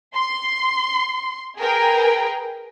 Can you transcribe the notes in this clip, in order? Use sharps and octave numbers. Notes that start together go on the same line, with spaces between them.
C6
G#4 A#4 B4 G5 A#5